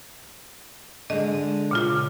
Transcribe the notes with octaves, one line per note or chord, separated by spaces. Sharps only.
D3 G#3 D#5
A#2 C#3 F4